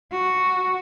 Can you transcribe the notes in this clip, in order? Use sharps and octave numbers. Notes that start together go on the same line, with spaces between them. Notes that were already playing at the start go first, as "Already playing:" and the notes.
F#4